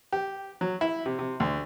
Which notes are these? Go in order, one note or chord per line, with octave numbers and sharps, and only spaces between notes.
G4
F#3
E4
C3
C3
D2